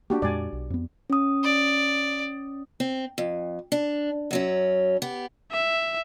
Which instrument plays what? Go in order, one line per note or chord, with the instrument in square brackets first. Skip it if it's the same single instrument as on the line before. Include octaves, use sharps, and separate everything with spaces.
[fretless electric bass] A#3 [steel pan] D4 F#4 G4
[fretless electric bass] F2 A#2 G#3 [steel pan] D5 G#5
[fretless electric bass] B1
F2 B3
[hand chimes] C#4 D#6
[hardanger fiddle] D5
[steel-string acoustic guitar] C4
F2
D4
F#2 F#3 C#4
B3 G4
[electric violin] E5